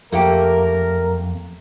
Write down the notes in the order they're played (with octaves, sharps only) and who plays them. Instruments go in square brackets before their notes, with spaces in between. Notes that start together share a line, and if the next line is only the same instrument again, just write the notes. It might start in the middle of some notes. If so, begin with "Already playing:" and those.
[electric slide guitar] F2 [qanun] A3 A#3 G4 [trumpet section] A#4